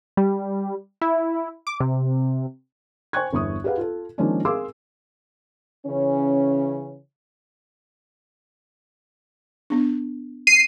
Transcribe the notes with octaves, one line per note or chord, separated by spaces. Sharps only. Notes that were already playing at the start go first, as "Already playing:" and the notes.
G3
E4
D6
C3
C5 G5 G#5 C#6 F#6 G#6
G1 E2 C#6 D#6
G4 G#4 B4 F5 F#5
F4 A4
D#3 F3 G#3 A#3 C#4 D4
G#4 A#4 F5 C6 D6 E6
C#3 E3 C#4
B3 D4
C7 D#7